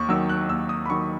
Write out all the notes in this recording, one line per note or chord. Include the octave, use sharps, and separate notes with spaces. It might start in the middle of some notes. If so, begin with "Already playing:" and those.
Already playing: D#2 C#6
D#3 F#3 E6
F#6
D#2 E6
D#6
B5
D#3 F#3 C#6